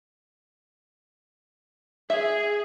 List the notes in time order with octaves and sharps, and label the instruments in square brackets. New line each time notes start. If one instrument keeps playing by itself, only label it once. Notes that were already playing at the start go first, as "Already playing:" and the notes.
[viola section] G#4 [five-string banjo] E5